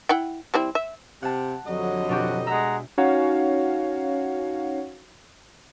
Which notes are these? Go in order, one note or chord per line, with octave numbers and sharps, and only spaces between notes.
E4 F#5 G5
G3 C4 E4
E5
C3 F#5 A5
F2 D3 F#3 G3 A4 D#5
B2 D4 F#4 G4
G#3 E5 F#5 A#5
C#4 D#4 F#4 C#5 F5 F#5